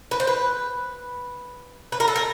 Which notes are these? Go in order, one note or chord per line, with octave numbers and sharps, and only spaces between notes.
B4
C5
B4
B4
A#4
A4
A#4